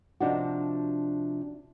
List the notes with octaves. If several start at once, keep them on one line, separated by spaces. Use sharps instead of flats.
C3 F3 D4 D#4 F#4